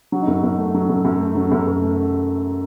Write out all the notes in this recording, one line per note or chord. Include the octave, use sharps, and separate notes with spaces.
F#3 F#4
D#4
F#2
F#4
F#2
A3
F#3
F#2
F#2
A3
F#3
F#2
F#2
A3